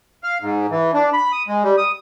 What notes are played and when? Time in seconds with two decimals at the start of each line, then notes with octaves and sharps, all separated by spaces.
0.24 F5
0.42 G#2
0.71 E3
0.94 D4
1.13 B5
1.32 D#6
1.48 G#3
1.63 G3
1.78 D#6